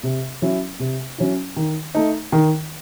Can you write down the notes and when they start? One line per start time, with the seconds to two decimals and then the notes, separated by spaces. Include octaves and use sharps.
0.03 C3
0.42 F#3 C#4 E4
0.80 C3
1.18 F#3 C#4 E4
1.56 D#3
1.95 A3 D#4
2.32 D#3